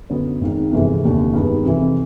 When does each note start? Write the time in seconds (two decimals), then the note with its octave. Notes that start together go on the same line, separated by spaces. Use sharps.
0.10 F#2 D3 F#3 B3
0.41 G#1 G#2 D#3
0.72 G1 F2 C3 E3 G#3
1.02 F1 D#2 D3
1.33 G2 D#3 G#3 B3
1.65 F2 C3 E3